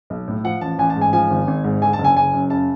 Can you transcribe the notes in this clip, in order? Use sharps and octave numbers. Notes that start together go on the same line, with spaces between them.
B1
A2
F3 F#5
A1 A5
A1 G#5
A5
G#2
G#5
F3 G#5
G#1
G#1
G#2
D3 G#5
A5
F#1
G#5
F#1 G#5
F#2
C#3 A5